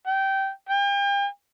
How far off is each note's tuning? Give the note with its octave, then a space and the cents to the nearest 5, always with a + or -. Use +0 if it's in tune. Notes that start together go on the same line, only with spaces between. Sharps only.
G5 -15
G5 +40